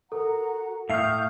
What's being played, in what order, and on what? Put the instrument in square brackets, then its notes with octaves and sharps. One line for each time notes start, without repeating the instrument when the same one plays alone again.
[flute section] F#4 F#5 A#5 [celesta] A4 A#4
[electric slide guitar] A2 F5 [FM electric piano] E5 F6 [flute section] C#6 D#6 G6